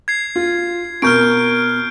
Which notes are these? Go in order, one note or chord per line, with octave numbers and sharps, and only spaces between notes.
G#6 C7
F4
B2 A#4 C#6 F6 G6 D7